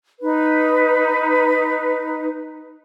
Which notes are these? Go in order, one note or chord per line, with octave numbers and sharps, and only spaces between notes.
D#4 B4